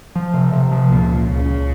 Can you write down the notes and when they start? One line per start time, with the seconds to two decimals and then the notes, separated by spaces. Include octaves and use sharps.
0.16 F3
0.34 C3
0.52 C3
0.71 F3
0.89 C#2 A#2
1.08 C#2
1.27 C#2 C#3
1.45 C#2